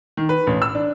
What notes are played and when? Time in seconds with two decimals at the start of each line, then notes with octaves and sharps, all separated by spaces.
0.17 D#3
0.29 B4
0.47 A1
0.62 E6
0.75 D4